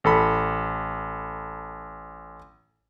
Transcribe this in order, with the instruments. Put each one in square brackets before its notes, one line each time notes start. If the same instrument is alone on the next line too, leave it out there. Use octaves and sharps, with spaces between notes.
[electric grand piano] A1 A4 B5